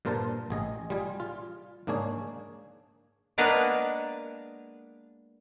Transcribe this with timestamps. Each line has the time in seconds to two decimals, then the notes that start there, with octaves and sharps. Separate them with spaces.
0.05 G2 A#2 F4 A#4 C5 A5
0.50 A1 G#4 D#5
0.90 G3 F4 G#4
1.20 F4
1.87 G#2 A#3 D4 G#4 C#5
3.38 G#3 A#3 B3 D4 B4 F5